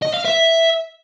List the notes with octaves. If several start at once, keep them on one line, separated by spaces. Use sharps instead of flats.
D#5
F5
E5